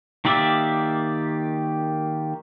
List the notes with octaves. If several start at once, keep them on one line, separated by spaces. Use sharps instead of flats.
D#3 A#3 G4 D5 E5